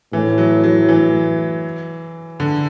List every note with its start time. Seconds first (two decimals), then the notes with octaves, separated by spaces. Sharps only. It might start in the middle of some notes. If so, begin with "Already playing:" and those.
0.13 A2 E3
0.38 F#3
0.63 F#3
0.89 E3
2.40 D3